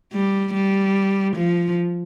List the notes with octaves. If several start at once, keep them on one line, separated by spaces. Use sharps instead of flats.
G3
G3
F3